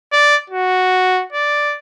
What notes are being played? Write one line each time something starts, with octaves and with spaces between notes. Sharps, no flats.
D5
F#4
D5